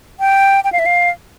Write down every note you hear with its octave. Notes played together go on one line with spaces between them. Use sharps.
G5
G5
F5
E5
F5